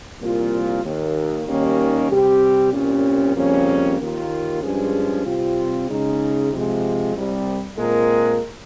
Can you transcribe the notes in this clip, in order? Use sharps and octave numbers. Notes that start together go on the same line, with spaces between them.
C2 A#2 F3 A#3 F4
D#2 D#3 A#3
D#2 D#3 G3 A#3 C#4
C3 G3 C4 G4
C2 A#2 G3 C#4
F2 C#3 G3 A#3 C#4
D#2 D#3 A#3 F4
G2 F3 G#3 C#4 G#4
C3 G3 C4 F4
C#3 G#3 D#4
C3 F3 G#3
C2 C3 G3
A#2 G#3 C4 F4 A#4